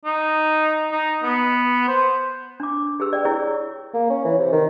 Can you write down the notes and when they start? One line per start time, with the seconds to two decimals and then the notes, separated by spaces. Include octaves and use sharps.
0.05 D#4
0.92 D#4
1.23 B3
1.88 C5
2.60 D4 D6
3.00 G4 G#4 B4 E6
3.13 D5 G5
3.25 E4 G#4 C#5 G5 C#6
3.94 A#3
4.10 C#4
4.25 E3
4.39 C3
4.53 D#3